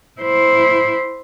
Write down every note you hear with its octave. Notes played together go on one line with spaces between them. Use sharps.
E4 C5